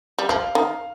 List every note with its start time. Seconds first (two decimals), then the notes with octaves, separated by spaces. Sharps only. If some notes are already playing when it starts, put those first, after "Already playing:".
0.19 G3
0.29 F3 F5
0.55 D#3